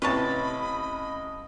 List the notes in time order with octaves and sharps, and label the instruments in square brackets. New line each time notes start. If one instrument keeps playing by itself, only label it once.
[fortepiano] A1 C3 [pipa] B4 C#5 A5 [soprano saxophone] D#5 [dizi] B5